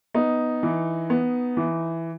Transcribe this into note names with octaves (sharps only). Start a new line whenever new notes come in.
B3 D#4
E3
B3
E3